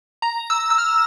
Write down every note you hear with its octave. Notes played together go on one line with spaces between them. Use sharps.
A#5
E6
E6
F6